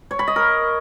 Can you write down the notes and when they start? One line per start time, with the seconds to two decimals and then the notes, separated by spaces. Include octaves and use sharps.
0.11 C#5
0.19 B5
0.28 D#5
0.36 A#4